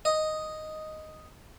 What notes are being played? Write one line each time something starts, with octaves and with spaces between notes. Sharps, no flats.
D#5